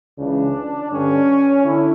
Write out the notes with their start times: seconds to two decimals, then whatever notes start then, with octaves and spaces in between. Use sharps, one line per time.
0.17 C#2 C#3 E3 D4
0.90 G2 D3 C#4
1.63 D3 E4